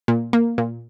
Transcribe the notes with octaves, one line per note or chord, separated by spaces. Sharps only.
A#2
A#3
A#2